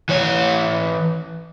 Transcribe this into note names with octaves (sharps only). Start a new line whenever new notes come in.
E3 C#5